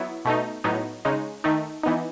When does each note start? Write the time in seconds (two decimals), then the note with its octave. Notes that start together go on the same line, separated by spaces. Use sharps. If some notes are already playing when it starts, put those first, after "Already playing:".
Already playing: F#3 B3 E4
0.25 B2 A3 D#4
0.64 A2 F#3 B3 D#4
1.05 C#3 G#3 D#4
1.44 D#3 A3 D#4
1.83 E3 B3 D#4